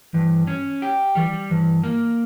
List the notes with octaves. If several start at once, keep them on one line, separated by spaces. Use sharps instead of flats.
G2 E3
C#4
G4
E3 G3
G2 E3
A#3